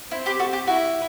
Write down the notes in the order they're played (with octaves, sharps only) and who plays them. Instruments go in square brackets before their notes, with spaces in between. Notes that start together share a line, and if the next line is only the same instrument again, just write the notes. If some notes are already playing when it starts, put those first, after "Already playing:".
[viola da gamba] C4 [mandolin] E4
[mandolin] G4 B4
F#4 A4
G4
[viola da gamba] E4 [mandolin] F#4